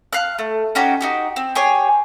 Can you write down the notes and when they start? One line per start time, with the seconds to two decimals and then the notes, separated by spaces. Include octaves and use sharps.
0.13 F5 F6 F#6
0.39 A3
0.75 C#4 D#4 F#4 G4
1.01 D#4 F#4 G4
1.36 C4
1.55 G4 G#4 C#5 G#5